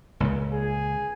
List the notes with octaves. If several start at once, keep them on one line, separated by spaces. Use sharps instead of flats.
C#2 A#2 C#3
G#4